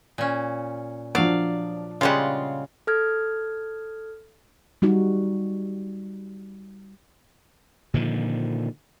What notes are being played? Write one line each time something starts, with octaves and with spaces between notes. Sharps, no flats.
A#2 C#4
F3 F#3 D4 D5 F5
C#3 G3 G#3 F4 F#5
A4 F6 G#6
G3 D#4 F#4
A#2 D3 D#3 F3